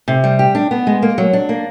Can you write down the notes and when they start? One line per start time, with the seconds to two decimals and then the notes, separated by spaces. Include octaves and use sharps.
0.08 C3
0.24 G3
0.39 G4
0.55 D4
0.71 B3
0.87 G#3
1.02 A#3
1.18 F#3
1.33 D4
1.49 A#3